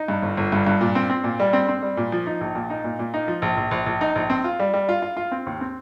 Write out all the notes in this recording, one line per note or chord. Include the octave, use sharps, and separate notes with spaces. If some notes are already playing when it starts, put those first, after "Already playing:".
Already playing: D#4
G2
G1
G1
G2
G2
A#2
C4
C4
A#2
G3
C4
C4
G3
A#2
F3
D#4
A#1
A#2
D#4
A#2
A#2
D#4
F3
A#1
A#1
A#1
A#1
D#4
A#1
C4
F4
G3
G3
F4
F4
F4
C4
D#2
C4